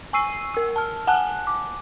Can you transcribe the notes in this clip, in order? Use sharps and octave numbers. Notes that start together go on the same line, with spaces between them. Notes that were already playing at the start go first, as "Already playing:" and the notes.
G#5 C#6 E6 C7 D#7
A#4 E6
A5 F6
F#5 G#5 A5 F#6
D6